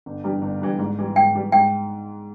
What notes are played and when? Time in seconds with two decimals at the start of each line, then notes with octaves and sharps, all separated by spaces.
0.06 G1
0.24 G2 E3 G3
0.42 G1
0.62 G2 E3 G3
0.79 G#2
0.98 E3 G3
1.16 G#2 G5
1.34 E3 G3
1.52 G#2 G5